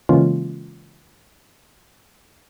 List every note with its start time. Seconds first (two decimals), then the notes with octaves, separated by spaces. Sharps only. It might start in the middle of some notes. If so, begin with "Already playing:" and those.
0.09 C#3 E3 G#3 A#3 C#4 F4